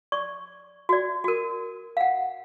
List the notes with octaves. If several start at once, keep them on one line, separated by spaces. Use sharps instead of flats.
D5 C#6
F#4 D5
F#4 A#4
F5 F#5